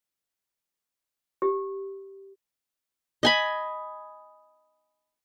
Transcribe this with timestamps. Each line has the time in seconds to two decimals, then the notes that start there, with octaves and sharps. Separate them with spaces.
1.42 G4
3.23 D#5 G#5 B5